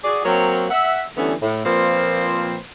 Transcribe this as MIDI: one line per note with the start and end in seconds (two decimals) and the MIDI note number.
0.04 0.20 66
0.04 0.20 68
0.04 0.20 74
0.25 0.65 54
0.25 0.65 58
0.25 0.65 60
0.25 0.65 70
0.25 0.65 73
0.70 1.03 76
0.70 1.03 78
1.17 1.33 50
1.17 1.33 52
1.17 1.33 55
1.17 1.33 57
1.17 1.33 59
1.17 1.33 61
1.42 1.61 45
1.65 2.58 46
1.65 2.58 53
1.65 2.58 58
1.65 2.58 60
1.65 2.58 71
1.65 2.58 72